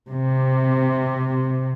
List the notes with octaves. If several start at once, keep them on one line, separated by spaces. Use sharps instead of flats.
C3